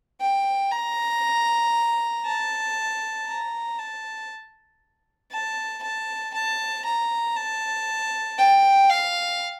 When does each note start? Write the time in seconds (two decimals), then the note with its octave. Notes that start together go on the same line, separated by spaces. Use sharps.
0.20 G5
0.72 A#5
2.25 A5
3.27 A#5
3.78 A5
5.31 A5
5.83 A5
6.34 A5
6.85 A#5
7.36 A5
8.38 G5
8.89 F5